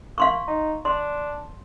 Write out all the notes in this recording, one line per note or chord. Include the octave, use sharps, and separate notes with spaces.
A#3 F5 C6 C#6
D#4
D4 C6